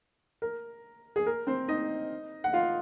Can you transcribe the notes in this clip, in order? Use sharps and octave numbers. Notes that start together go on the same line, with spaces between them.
A#4
G#4
A#4
C4 C5
D#4 D#5
F#5
F4 F5